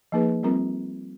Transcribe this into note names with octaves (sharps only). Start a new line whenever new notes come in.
F3 A#3 D#4 G#4 B4
G3 C4 F4 A#4